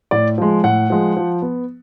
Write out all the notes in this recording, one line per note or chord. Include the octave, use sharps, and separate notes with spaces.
A2 D5
F3 G#3
A2 F#5
F3 G#3
F3
B3